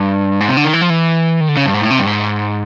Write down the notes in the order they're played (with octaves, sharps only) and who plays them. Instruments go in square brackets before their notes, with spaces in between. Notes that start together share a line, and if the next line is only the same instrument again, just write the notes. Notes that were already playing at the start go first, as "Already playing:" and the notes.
Already playing: [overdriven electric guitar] G2
G#2
C3
D3
D#3
E3
F3
E3
D#3
D3
C#3
G2
G#2
A2
C3
G2
G#2